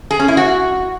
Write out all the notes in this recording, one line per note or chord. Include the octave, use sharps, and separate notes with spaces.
G#4
C#4
E4
F#4